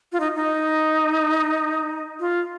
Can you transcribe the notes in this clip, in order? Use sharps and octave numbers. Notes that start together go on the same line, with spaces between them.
F4
D#4
D#4
F4